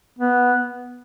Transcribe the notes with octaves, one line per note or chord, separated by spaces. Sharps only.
B3